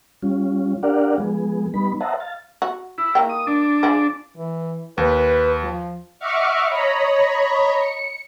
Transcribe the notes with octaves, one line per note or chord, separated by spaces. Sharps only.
G3 C#4 F4
D4 G4 A#4 D5 F5 F#5
F3 G#3 B3 G#4
G3 B3 D#4 B5
C5 D#5 E5 F#5 A5 A#5
F5 A6
F#4
E4
D#3 A#3 G5
D#6
D4
F3 G#4 C5
E3
D#2 B4
F3
D#5 E5 F#5 C#6 D6 F6
C#5 D#5 A#5 B5
C#7